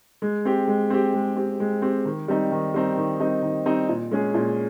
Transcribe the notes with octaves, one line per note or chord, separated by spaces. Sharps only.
G#3
C4 G4
G#3
C4 G4
G#3
C4 G4
G#3
C4 G4
D#3
G3 C4 D#4
D#3
G3 C4 D#4
D#3
G3 C4 D#4
D#3
G3 C4 D#4
A#2
G#3 C#4 G#4
A#2